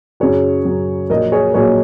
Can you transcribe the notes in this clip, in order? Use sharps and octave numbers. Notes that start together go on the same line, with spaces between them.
F#2 C#3 F#3 G#4 C#5
F#2 C#3 F#3
A#1 A#2 F#3 A#4 D#5
G#4 C#5
A#1 A#2 F#3 G#4 C#5